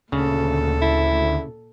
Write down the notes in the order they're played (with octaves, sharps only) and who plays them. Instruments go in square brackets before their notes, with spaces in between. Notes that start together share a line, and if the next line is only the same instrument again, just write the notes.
[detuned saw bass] D2 [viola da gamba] A#2 A4 [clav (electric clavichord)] C#3
[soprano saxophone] E4